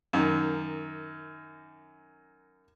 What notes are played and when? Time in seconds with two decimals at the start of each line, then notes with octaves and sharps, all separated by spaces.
0.13 F#2 D#3